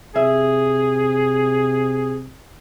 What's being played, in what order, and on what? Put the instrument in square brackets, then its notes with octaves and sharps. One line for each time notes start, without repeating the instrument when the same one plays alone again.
[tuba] C3 [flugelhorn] G#4 [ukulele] E5